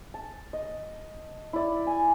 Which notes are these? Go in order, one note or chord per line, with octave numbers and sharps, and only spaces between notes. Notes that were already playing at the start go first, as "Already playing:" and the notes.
A5
D#5
E4 D5
G#5